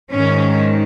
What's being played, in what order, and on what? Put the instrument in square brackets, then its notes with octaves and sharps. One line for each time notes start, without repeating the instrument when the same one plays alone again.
[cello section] G#2 D#3 C#4